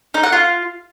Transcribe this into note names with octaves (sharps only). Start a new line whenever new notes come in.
D#4
F#5
F4